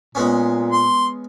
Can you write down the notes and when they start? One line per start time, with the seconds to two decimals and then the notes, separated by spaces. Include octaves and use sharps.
0.15 A#2 G#3 B3 C#4
0.71 C6